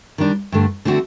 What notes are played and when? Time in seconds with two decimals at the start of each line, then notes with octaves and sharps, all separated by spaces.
0.18 D#3 G3 D4
0.52 G2 D3 A3
0.85 D3 A3 C4 F#4